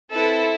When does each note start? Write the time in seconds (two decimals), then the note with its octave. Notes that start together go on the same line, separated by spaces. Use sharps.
0.13 C4 E4 A4 B4